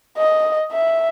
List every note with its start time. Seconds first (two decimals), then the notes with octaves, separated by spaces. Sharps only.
0.18 D#5
0.72 E5